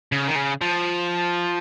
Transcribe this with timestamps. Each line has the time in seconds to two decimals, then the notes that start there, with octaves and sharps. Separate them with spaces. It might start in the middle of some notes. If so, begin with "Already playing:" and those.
0.12 C#3
0.27 D#3
0.35 C#3
0.61 F3